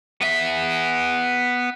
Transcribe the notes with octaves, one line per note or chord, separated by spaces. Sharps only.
B3 E5